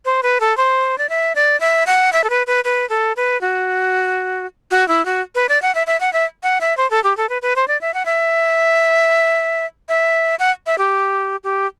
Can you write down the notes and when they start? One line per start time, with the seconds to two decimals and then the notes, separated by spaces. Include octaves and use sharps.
0.05 C5
0.23 B4
0.40 A4
0.57 C5
0.98 D5
1.09 E5
1.35 D5
1.60 E5
1.87 F#5
2.13 E5
2.24 A4
2.30 B4
2.47 B4
2.64 B4
2.89 A4
3.16 B4
3.41 F#4
4.71 F#4
4.88 E4
5.06 F#4
5.35 B4
5.49 D5
5.62 F#5
5.75 E5
5.87 E5
6.00 F#5
6.13 E5
6.43 F#5
6.61 E5
6.77 C5
6.91 A4
7.04 G4
7.17 A4
7.29 B4
7.42 B4
7.56 C5
7.68 D5
7.81 E5
7.94 F#5
8.06 E5
9.89 E5
10.39 F#5
10.66 E5
10.78 G4
11.44 G4